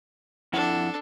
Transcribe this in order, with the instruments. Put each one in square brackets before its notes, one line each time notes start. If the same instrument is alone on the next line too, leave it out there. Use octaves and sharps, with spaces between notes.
[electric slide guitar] F2 E4 F#5 [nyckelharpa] D4 A4